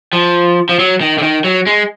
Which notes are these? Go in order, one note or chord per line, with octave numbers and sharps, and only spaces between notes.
F3
F3
F#3
D#3
D3
D#3
F#3
G#3